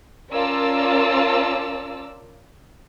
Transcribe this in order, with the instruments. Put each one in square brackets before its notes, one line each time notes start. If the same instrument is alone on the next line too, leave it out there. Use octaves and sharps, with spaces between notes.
[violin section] C#4 F4 A#4 D5 A5 E6